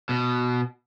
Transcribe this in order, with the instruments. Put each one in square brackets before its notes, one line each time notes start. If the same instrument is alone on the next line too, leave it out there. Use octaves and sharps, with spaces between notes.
[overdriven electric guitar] B2